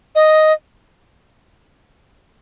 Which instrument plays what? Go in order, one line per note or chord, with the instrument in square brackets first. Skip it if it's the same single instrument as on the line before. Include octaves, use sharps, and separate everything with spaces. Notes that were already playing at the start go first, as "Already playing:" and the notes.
[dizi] D#5